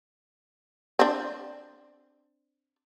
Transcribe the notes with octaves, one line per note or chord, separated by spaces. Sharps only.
C4 D4